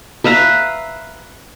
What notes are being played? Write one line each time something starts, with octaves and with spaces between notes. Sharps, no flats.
B4 E5 F5 A#5